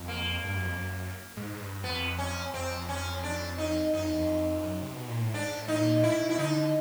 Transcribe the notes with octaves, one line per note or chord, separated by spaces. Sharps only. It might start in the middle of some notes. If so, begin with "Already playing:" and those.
Already playing: F2
A#3
G2
F#2
F2
F#2
G#2
G#2
G2
F2 B3
C#4
F2 C4
C#4
D4
D#4
F#2 D#4
F2
E2
F2
F#2
C3
B2
A#2
A2
G#2 D4
G#2
A2
D#4
A#2
A#2
A2 E4
B2
E4
D3 D#4
D3